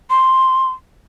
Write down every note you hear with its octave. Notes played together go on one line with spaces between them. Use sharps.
C6